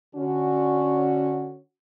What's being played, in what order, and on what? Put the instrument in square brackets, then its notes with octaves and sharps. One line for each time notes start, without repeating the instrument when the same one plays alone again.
[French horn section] D3 C#4 F#4